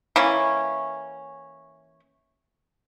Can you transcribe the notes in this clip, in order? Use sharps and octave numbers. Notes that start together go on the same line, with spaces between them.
E3 A#3 C#4